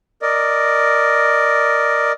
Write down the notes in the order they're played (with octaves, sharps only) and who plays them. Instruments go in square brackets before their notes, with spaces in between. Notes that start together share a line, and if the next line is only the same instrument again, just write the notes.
[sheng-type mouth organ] A#4 D5 D#5